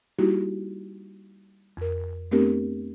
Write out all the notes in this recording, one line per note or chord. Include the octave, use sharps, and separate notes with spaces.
G3 A#3 D#4 E4 F#4 G4
F2 A#4
A3 B3 C4 D4 G4 A#4